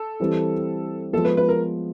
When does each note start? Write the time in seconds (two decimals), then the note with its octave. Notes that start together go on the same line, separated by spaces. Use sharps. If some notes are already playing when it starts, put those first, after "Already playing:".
Already playing: A4
0.20 E3 G3 C4
1.13 F3 G#3 B3 A4
1.25 B4
1.37 B4
1.49 A#4